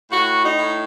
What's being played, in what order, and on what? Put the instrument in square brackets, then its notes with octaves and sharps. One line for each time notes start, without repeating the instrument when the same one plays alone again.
[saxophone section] A2 F#4
D#4
A2